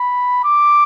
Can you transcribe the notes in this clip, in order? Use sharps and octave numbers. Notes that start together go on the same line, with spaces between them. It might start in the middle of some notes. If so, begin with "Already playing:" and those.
Already playing: B5
D6